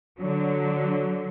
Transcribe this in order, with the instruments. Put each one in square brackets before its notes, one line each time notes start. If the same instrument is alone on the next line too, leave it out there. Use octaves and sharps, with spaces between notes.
[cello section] D3 F#3